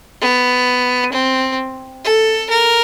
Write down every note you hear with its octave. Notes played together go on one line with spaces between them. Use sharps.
B3
C4
A4
A#4